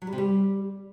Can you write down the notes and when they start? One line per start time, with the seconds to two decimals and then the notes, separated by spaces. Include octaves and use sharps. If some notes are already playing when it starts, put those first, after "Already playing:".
0.02 F#3
0.07 G3
0.12 C3
0.18 G3